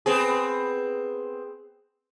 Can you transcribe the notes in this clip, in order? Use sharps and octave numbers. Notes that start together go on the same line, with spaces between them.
B3 C4 G#4